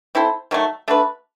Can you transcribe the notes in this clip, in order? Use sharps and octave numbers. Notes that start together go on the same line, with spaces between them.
C4 E4 A4 C5
D#3 F#3 A3
A3 D4 F#4 B4